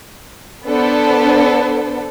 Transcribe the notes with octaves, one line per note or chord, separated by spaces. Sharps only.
B3 D4 A4 C5